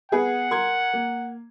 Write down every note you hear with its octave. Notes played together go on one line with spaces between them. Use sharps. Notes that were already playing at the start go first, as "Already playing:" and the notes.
B3 G#4 B4 F#5
A#4 C6 G#6
A#3